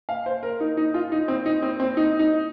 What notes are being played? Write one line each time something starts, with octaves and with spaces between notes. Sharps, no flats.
F5
C5
A#4
D#4
D#4
F4
D#4
C4
D#4
C4
C4
D#4
D#4